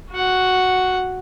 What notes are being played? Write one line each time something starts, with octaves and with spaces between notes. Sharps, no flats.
F#4 F#5